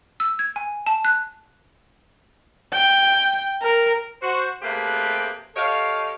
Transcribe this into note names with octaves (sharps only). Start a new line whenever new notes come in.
E6
G#6
G#5
A5
F#6
G5
A#4
F#4 C5
C3 A3 A#3 G4 G#4 B4
G4 A4 C#5 D#5 F5